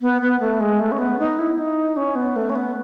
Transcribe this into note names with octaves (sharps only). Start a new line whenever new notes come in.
B3
B3
A3
G#3
A3
C#4
B3
D#4
E4
D#4
C#4
B3
A3
C#4
B3